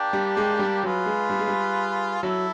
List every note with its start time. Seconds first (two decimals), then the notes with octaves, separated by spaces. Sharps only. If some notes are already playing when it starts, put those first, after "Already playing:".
Already playing: A#3 D4 G4
0.13 G3
0.37 G#3
0.59 G3
0.83 F#3 F4 G#4 B4
1.06 G#3
1.30 G3
1.39 G#3
1.48 G3
2.23 F#3 E4 A4